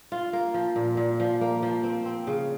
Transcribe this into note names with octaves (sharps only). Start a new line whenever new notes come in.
F4
A#3
F3
A#2
A#2
F3
A#3
F3
C4
C4
C#3